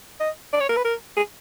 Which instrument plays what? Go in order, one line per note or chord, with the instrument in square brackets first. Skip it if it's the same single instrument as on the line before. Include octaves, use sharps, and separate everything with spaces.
[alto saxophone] D#5
D5
C#5
A#4
B4
A#4
G#4